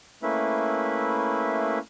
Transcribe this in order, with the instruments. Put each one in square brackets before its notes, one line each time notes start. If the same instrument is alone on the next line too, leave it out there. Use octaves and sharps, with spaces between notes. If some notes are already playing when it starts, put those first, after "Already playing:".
[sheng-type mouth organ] A3 A#3 C#4 E4 B4 E5